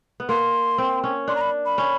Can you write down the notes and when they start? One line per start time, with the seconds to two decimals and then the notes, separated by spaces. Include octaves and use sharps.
0.20 B3
0.29 A#3 C6
0.78 C4
1.04 C#4
1.28 D4 C6
1.36 A#5
1.41 B5
1.66 B5
1.78 C#4